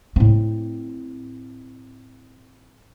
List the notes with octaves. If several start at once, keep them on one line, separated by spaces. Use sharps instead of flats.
A2 C4